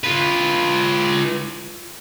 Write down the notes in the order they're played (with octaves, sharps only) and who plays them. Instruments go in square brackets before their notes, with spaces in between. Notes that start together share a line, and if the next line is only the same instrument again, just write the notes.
[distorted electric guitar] F4 B4